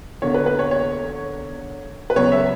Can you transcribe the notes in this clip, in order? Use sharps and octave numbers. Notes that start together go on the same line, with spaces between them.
E2 D3 A#3 C#5
B4
B4
C#5
C#5
B4
E2 C#3 F#3 B3 C#5
E5